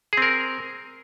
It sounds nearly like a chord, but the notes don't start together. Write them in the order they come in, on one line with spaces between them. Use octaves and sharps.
G#4 C4 A#4